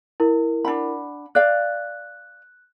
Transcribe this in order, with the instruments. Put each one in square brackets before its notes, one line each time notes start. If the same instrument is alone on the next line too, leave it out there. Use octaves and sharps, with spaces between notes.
[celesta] E4 A#4
[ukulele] D4 F#5 B5
[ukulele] D5 F5 [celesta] F#6